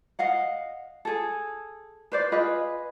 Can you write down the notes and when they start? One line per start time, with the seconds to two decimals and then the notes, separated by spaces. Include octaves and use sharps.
0.19 D#5 F5 F#5
1.05 G#4 A4
2.12 B4 C5 D5
2.32 F4 G#4 B4 D#5